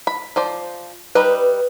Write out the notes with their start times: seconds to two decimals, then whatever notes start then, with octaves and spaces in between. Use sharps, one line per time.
0.07 B5
0.36 F3 C5 D5
1.15 G3 D#4 B4